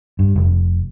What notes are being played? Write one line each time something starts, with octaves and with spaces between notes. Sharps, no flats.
G2
F1